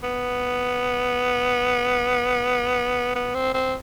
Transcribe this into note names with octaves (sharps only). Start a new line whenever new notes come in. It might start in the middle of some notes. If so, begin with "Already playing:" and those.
B3
B3
C4
C4